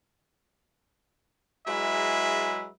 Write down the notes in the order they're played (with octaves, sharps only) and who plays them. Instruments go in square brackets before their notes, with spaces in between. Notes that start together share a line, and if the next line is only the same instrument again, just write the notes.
[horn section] F#3 G#3 E4 G#4 B4 E5